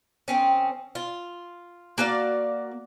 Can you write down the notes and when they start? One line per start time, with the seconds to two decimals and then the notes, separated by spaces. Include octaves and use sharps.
0.28 D#3 C4 C#4
0.95 F4
1.98 A#3 F#4 D5 F5